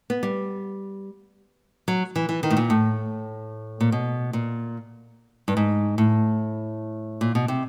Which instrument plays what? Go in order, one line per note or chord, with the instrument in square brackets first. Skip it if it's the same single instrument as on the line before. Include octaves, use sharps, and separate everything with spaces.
[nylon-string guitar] B3
G3
F#3
E3
E3
D#3
A2
A#2
A2
A#2
B2
A#2
G2
G#2
A2
A#2
B2
C3